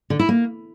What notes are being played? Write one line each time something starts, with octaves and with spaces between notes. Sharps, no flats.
D3
E4
A#3